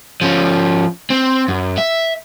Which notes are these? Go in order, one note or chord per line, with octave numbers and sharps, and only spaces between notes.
F3 C#4
C4
F#2
E5